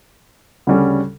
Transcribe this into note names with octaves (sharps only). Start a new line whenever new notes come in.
D2 C#3 G3 C#4